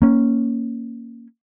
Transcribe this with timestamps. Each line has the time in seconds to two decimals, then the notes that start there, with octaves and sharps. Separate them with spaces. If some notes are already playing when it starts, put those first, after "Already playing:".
0.02 A#3 C#4